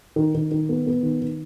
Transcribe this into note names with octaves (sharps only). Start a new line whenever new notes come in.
D#3
D#3
D#3
B3
B3
D#3
D#3